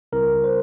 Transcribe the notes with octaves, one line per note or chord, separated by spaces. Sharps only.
C#2 C#3 G3 C4 E4 A#4
C5